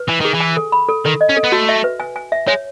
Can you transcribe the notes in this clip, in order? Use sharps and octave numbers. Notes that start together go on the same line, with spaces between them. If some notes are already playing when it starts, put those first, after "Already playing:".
Already playing: B4
E3 G#5
D#3 G#4
E3
G#5
A4
B5
A4
D#3 A4
D#5
C#4
A4
B3
A3 F#4
E5
B4
G#5
G#5
E5
G#3 C#5